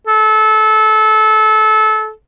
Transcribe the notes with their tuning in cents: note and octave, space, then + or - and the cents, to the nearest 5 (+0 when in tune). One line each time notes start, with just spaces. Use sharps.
A4 -25